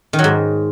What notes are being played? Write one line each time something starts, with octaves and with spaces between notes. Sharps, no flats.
D#3
F#3
G#2